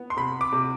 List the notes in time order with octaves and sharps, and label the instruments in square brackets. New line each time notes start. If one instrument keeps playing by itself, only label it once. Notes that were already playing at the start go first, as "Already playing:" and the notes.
Already playing: [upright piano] B3
[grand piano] C6
[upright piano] C3 [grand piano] B5
[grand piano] D6
[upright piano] C3